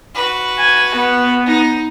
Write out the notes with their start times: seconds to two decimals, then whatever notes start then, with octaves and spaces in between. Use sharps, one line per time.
0.15 F#4 B4
0.59 G#5
0.96 B3
1.46 D#4